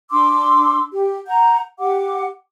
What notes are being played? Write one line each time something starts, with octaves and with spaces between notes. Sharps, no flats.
D4 C6 D6 E6
G4
F#5 A#5 G6
G4 F#5 D6